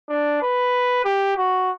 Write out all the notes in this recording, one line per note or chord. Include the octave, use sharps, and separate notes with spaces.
D4
B4
G4
F#4